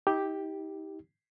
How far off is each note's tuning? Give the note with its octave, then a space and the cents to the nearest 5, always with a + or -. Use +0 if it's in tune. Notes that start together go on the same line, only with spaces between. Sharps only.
D#4 +40 G4 +0